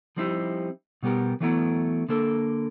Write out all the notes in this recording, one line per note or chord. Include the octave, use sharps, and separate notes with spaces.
F3 G3 C4 D#4 E4 G4
B2 G3 B3 G4 A#4
E3 F#3 A3 B3 E4 A#5
D3 A#3 A4 A#4